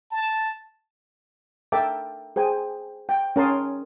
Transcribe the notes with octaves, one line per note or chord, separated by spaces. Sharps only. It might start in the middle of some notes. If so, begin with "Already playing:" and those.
A5
A4 A#4 E5 G5 A5 D6
G#4 C5 G5 G#5
G5
C#4 A#4 A5 C6 D#6